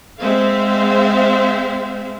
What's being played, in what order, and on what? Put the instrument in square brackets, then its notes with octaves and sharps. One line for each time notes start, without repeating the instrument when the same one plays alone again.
[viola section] G#3 C4 C5 E5 F5